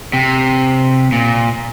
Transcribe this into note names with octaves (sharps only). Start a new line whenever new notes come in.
C3
A#2